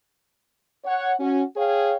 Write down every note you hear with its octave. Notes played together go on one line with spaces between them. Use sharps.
C#5 F#5
C#4 F#4
G#4 C#5 F5 G5